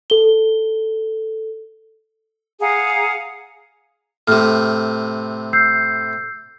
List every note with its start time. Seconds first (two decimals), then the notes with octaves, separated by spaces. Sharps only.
0.10 A4 G7
2.60 G#4 F5 F#5 A#5
4.28 A2 C3 F6
5.53 E6 G6 C7